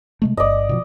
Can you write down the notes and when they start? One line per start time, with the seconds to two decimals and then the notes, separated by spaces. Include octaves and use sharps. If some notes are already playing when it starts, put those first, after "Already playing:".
0.22 C3 G#3 A3
0.37 G1 G2 D5 D#5
0.69 B2 D#3 F3